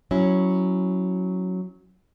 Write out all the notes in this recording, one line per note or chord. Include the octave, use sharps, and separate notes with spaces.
F#3 C#4 E4